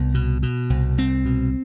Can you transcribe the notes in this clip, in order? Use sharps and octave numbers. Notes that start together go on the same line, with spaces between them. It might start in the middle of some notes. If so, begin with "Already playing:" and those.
Already playing: C2 B3
B2
B2
C2
C2 C4
B2